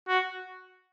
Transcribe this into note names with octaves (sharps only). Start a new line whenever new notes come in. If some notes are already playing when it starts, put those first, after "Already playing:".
F#4